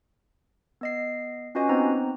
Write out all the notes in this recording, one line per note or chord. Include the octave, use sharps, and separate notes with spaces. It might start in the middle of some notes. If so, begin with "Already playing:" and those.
B3 D#5 C7
C#4 F4 F#4 B4 D#5 G#5
B3 C4 D#4 C5 A#5